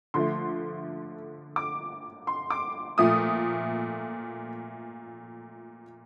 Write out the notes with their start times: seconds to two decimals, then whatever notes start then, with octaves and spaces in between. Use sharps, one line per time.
0.14 D3 F3 A3 C6
1.56 D6
2.27 C6
2.50 D6
2.98 A#2 F3 A3 D#6